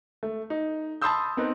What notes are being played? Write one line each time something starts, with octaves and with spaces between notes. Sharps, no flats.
A3
D#4
A5 B5 C6 D#6 E6 G6
B3 C4 D#4 A#4 B4